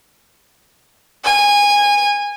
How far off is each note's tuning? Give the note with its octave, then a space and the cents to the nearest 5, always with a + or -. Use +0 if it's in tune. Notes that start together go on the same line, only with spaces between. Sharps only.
G#5 -20